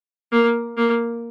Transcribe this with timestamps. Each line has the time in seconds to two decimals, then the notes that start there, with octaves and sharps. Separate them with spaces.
0.32 A#3
0.77 A#3